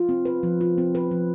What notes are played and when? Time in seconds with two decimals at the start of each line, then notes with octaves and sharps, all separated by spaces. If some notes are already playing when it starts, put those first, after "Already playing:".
Already playing: F4
0.09 C4
0.25 B4
0.43 F3
0.61 F4
0.78 C4
0.95 B4
1.11 F3